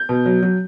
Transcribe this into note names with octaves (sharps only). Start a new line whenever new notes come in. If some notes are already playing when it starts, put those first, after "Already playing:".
Already playing: G6
B2
F#3
F#3